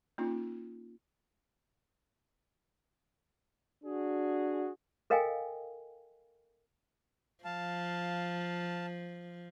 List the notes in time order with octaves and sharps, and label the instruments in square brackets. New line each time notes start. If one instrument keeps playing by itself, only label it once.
[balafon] A#3 C#4 D#4 F4
[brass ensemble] D4 F#4 G#4
[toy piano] A4 A#4 D#5 F5 G5 G#5
[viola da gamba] F3 [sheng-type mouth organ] F5 A5